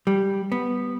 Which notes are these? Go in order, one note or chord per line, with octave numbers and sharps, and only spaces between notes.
G3
B3